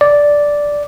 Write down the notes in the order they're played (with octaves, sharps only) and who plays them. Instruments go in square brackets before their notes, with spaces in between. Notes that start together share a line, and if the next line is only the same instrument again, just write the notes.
[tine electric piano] D5